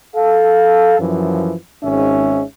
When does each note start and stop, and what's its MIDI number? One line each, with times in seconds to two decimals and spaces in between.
0.15 0.96 69
0.15 0.96 77
0.99 1.54 42
0.99 1.54 52
0.99 1.54 53
1.83 2.42 32
1.83 2.42 44
1.83 2.42 61
1.83 2.42 76